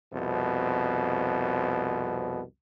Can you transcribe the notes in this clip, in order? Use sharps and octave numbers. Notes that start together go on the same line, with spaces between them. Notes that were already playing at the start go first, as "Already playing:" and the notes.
C2 F2 B2